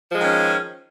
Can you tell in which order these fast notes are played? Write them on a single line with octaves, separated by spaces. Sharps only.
F3 G#3 D#3 C#4